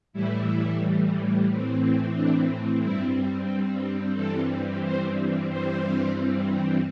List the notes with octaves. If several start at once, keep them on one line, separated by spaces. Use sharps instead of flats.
A2 E3 G3 E4
A2 E3 C4
D4
G2 G3 C4 E4
G2 E3 G3 C4 A4
C5
G2 E3 G3 C4 C5